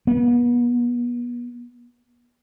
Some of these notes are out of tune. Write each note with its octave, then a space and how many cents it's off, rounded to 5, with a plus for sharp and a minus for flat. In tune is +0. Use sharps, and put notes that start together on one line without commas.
B3 -35